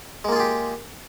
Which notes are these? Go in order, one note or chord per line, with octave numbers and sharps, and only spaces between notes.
G#3 A#3 F4 G4 G#4